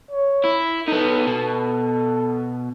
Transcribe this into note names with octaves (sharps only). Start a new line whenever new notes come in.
C#5
E4
B3 D#4 A4
B2